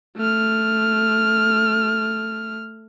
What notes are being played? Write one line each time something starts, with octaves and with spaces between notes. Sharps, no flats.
A3 F6